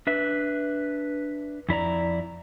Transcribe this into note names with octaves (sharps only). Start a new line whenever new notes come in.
D4 B4 E5
F2 E4 D5 A#5